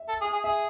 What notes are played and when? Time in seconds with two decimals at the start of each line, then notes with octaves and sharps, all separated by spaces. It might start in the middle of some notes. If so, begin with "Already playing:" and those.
Already playing: E5
0.09 A4
0.21 G#4
0.33 G#4
0.44 G#4 E5